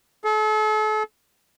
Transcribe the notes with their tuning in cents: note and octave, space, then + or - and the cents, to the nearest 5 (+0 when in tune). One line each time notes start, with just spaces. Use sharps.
A4 -40